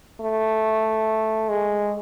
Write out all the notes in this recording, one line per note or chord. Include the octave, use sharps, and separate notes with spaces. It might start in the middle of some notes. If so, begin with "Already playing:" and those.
A3
G#3